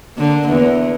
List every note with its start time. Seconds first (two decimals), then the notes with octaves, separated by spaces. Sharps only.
0.15 D3 A#3
0.49 E2